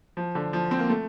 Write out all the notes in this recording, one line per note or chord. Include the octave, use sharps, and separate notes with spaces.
F3
D3
F3
C4
A#3
A3